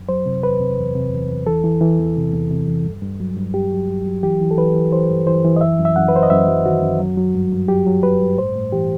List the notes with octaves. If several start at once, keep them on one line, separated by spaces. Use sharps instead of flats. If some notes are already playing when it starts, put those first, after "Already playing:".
Already playing: F#2
F#3 C5
C3
E2 B4
C3
E2
C3
E2
E2
E3 A4
E3
E3
E2
C3
E2
C3
E2
G2
G2
F#3
G2
G2 G4
F#3
G2
F#3
E3 G4
E3
A4
E3 B4
E3
E3 C5
G2
E3 C5
E3
D#5
F#2 E5
F#2
E5
F#2 F#5
B4
F#2 C5
D#5
F#2 E5
F#3
D#3 F#4
F#2
F#3
F#3
G2
G2
F#3 G4
F#3
F#3 B4
G2
A2 C5
A2
E3 G4